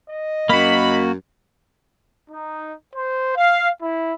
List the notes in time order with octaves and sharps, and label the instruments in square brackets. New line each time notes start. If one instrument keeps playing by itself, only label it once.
[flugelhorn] D#5
[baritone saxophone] F#2 [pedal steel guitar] A#3 F#4 [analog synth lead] B5
[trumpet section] D#4
C5
F5
E4